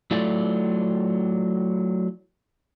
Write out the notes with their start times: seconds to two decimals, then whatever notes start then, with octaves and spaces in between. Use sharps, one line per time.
0.11 F#3 A3 E4 F4 A4 D5